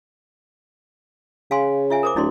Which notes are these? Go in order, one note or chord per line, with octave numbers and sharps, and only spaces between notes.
C#3 F5 G#5 C6
F4 E5 G#5
A#4 C5 D6
D1 E4 D5 C6